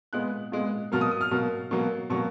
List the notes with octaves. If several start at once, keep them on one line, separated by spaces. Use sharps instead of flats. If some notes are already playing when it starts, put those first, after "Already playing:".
A#2 G#3 B3 F#6
A#2 G#3 B3
B2 F#3 A#3 F6
D#6
D#6
F6
B2 F#3 A#3
B2 F#3 A#3
B2 F#3 A#3 C#6